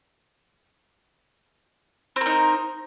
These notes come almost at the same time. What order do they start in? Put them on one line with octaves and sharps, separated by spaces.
C4 A#4 D#4